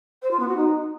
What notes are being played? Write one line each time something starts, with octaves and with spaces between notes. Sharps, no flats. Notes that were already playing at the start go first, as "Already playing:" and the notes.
C5
F4
B3
F#4
D#4